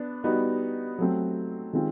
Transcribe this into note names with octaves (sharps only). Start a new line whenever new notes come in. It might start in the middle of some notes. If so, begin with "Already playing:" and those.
Already playing: B3 D4
G3 B3 D#4 F#4
F#3 A3 C4
D#3 G#3 C4 F4